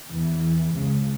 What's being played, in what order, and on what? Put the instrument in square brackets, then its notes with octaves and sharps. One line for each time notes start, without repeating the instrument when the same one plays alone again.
[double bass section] E2 E3
C#2 C#3